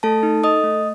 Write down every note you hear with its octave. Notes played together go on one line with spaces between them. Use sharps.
A3 A4 A5
D#4
A4 D#5 D#6
A3